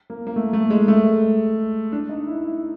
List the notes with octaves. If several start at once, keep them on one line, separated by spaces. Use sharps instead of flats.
A#3
A#3
A3
A3
G#3
A3
D4
D#4
E4
E4